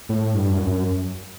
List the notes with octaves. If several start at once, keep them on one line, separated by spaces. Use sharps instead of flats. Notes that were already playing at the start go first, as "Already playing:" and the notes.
A2
G2
F#2
F#2